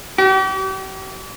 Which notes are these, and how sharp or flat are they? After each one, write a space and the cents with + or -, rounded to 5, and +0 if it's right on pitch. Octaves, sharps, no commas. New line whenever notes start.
G4 -40